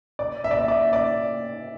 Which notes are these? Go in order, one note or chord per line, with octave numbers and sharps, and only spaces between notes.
D5
E5
D5
E5
D5
D5